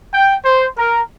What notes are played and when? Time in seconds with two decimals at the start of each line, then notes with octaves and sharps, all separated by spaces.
0.13 G5
0.44 C5
0.77 A#4